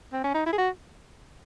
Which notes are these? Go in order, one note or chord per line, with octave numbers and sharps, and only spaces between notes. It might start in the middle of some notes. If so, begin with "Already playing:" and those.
C4
C#4
D#4
E4
G#4
F#4